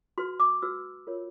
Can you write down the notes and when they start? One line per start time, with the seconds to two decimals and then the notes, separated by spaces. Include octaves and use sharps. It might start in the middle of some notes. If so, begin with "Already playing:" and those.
0.18 F#4 B4 C6
0.40 D6
0.62 F#4 B4 E6
1.07 F4 A#4 C#5